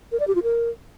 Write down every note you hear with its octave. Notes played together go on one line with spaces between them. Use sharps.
A#4
D5
G4
F4
A#4